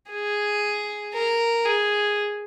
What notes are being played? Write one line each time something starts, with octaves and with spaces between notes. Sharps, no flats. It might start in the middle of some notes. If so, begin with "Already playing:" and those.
G#4
A#4
G#4